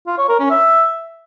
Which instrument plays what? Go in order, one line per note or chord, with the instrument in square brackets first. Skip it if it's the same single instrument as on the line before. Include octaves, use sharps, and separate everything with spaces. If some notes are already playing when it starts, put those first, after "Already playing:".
[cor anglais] F4
C#5
A#4
C#4
E5